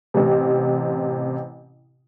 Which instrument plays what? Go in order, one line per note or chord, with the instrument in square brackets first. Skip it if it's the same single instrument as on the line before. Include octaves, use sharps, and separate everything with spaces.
[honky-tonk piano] A1 C3